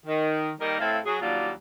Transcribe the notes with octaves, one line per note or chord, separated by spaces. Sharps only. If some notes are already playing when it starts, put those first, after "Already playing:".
D#3
D#3 G3 A#3 D#4 A#4
A2 C4 E4 A4 F5
F#3 G#4
D#2 F#3 G3 D4 F4 D5